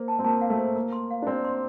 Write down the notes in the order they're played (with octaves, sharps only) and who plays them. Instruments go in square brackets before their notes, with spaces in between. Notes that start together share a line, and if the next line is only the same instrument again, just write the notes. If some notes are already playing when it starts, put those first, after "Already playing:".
Already playing: [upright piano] A#3 [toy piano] C5
[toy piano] A5
[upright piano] C4
[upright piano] A#3 [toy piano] A5
[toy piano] F5
[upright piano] A3
[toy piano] C5
[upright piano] A#3 [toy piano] A#4
[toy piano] C6
F5
[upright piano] D4
[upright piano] C4 [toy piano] D5
[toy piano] C6